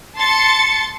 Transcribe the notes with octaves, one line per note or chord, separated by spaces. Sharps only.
A5 C6 A6 C#7